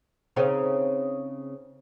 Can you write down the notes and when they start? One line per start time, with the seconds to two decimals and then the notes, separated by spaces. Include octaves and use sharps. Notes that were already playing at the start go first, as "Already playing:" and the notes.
0.36 C#3 C4 D#4